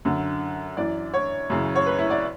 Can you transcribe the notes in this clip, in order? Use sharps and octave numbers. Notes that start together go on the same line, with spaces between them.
F#2 D3
F#2 E3 D5
C#5
F#2 C#3 E3
C#5
B4
E4
D5